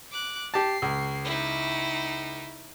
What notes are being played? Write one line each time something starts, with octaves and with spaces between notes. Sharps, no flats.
D6 F#6
G4 A5 C7
C#2
D#4 E4